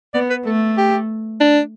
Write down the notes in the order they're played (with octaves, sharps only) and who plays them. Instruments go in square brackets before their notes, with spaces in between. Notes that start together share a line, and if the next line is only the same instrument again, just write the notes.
[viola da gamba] B3 [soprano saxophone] D5
[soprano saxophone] B4
[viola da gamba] A3 [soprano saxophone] A4
[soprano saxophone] G4
D4